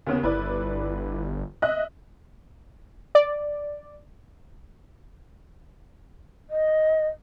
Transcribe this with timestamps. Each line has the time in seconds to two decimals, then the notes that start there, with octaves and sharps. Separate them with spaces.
0.07 D#2 C#3 B3
0.23 G1 E4 B4 D5
1.62 D#5 E5 F#6
3.15 D5
6.50 D#5